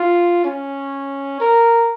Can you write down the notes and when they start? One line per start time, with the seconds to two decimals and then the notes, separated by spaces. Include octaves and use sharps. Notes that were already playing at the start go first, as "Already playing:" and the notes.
Already playing: F4
0.44 C#4
1.40 A#4